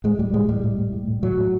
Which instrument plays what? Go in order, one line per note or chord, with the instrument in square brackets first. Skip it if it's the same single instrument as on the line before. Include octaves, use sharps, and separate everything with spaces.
[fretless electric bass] A2 G#3
A2 G3
A2 G#3
A2 G3
A2
A2
A2
A2
A2 F#3
A2